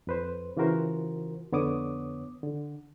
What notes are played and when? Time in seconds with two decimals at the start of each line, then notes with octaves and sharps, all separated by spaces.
0.07 F2 B4 C5
0.57 C#3 E3 F4 F#4 A#4 C5
1.52 F2 D3 B3 C#5 D6 D#6
2.43 D3